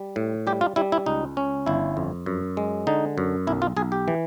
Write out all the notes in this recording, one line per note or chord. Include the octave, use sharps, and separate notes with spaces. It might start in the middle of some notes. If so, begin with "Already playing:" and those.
Already playing: G3
A2
G3 G4
F4
G3 E4
E4
C#2 D#4
C#4
G1 E4
F2
F#2
G#3
D3 D#4
F#2
B1 E4
F4
B1 G#4
G4
E3